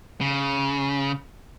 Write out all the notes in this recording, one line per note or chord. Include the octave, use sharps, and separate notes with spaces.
C#3